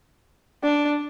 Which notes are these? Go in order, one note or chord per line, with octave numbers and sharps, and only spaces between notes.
D4